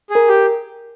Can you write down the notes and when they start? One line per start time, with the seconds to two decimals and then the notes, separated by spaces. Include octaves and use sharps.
0.10 G#4
0.15 A#4
0.28 G4